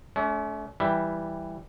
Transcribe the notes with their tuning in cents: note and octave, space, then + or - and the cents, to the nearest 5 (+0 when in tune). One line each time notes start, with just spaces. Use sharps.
A3 -30 C#4 +40
E3 +0 G3 +0 E5 +0